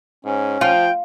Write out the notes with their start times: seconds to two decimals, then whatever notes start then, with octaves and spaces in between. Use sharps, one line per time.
0.25 G#2 C#4
0.61 F3 F4 G5